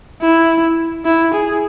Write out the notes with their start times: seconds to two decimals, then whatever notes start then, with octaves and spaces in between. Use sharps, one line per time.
0.21 E4
1.05 E4
1.34 G#4